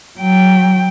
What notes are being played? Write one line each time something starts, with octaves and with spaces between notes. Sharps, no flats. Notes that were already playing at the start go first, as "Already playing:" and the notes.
F#3 G5